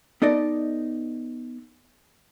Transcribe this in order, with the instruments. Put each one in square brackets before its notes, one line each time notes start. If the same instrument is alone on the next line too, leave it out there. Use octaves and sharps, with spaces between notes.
[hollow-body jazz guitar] B3 D#4 A4 D5 D#5